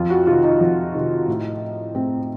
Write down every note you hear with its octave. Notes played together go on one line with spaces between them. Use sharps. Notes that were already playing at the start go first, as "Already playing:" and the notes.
Already playing: F2 F4
F#4
C3 D#3 F4
D#4
F2
C3 D#3
A2
A2 C4